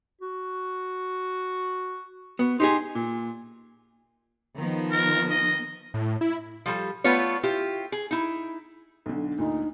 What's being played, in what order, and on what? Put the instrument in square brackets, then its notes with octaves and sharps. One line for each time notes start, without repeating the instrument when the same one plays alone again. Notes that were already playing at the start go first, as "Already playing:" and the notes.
[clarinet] F#4
[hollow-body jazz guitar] B3 [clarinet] F#4
[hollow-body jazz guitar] D#4 G4 G#4 [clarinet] C6
[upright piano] A#2
[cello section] D#3 F3 B3
[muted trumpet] A#4
D#5
[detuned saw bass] A2
E4
[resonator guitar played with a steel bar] F3 G3 A4
A3 B3 F4 B4 C#5
E4 F4 G4
G#4
D#4 E4
[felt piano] B1 D3
[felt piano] D2 A#2 [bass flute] D#4